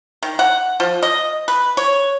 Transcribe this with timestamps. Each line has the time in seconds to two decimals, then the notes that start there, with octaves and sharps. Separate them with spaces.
0.23 D#3
0.39 F#5
0.80 F3
1.03 D#5
1.48 B4
1.77 C#5